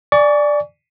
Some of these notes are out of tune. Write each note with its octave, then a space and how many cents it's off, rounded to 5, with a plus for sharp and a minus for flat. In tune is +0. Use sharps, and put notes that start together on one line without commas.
D5 +0 G#5 +0 C#6 +35